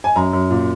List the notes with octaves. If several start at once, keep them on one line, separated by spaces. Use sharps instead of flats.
G#5
F#2 A#5
F#2
A#2